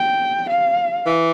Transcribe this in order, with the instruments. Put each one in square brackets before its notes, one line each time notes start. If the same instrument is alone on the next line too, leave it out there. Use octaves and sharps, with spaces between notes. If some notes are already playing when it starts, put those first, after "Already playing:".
Already playing: [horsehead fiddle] G5
F5
[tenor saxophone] E3